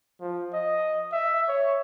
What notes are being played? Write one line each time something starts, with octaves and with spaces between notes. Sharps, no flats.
F3
D#5
E5
C#5